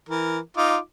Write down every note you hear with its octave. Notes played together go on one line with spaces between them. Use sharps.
E3 A#4
D#4 F4 D6